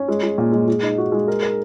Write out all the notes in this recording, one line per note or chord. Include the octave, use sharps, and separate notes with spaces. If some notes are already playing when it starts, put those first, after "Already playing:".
Already playing: C#4
G#3
G#3
A#2
G#3
G#3
D#4
F#4
G#3
A#4
A#4